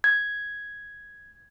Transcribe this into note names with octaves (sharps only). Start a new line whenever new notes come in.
G#6